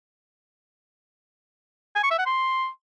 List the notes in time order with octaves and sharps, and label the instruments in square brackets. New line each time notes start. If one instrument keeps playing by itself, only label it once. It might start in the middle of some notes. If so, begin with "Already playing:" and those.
[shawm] G#5
C#6
E5
F#5
C6